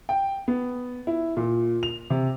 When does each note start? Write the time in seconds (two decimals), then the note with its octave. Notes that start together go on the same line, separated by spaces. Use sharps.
0.09 G5
0.48 B3
1.07 E4
1.37 A#2
1.83 F7
2.10 C3